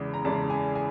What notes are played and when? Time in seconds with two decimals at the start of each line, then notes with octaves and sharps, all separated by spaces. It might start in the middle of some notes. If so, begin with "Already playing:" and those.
Already playing: E2 C#3 E3 G#3
0.14 A#5
0.25 E2 C#3 E3 G#3 A5
0.50 G#5
0.75 G#5